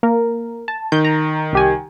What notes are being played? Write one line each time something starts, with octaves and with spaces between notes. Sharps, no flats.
A#3 A#4
A5
D#3 G6
A#5
C2 G4 G#5